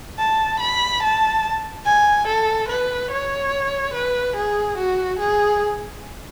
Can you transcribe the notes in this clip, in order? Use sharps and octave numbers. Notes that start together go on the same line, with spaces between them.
A5
B5
A5
G#5
A4
B4
C#5
B4
G#4
F#4
G#4